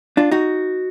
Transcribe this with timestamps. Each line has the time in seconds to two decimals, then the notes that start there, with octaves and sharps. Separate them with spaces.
0.17 D4 F4
0.31 D#4 F#4